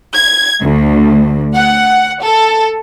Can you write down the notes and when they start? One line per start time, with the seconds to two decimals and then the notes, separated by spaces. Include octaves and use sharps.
0.14 G#6
0.61 D2
1.55 F#5
2.23 A4